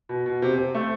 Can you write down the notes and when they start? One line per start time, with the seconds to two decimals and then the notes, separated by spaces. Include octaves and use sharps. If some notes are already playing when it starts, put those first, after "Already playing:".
0.09 B2
0.26 B2
0.42 C3
0.58 C3
0.74 A3